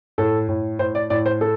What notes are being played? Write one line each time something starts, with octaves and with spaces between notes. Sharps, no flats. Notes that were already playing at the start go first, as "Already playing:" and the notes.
A2 A4
A2
A2 C5
D5
A2 D5
C5
A4